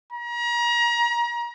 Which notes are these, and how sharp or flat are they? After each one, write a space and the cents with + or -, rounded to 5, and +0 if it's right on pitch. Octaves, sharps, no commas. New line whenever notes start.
A#5 +35